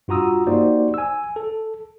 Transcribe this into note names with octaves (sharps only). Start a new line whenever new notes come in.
G2 F4 F#4 A#5 D#6 E6
A#3 D#4 F#4 G4 C5 D5
G#5 E6
A4